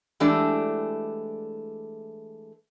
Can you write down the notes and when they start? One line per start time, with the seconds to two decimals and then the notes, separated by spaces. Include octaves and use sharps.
0.20 E3 G#3 A3 D4 G4 D5